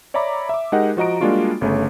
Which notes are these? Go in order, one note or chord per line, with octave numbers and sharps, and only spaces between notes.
C#5 D5 E5 A#5 B5 D6
E5 D6
G#3 D#4 G4 A#4 D#5 F#5
F3 F#4 D#5 A#5 D7
G3 G#3 A#3 D4 F4 F#4
G1 C#3 A3 C#5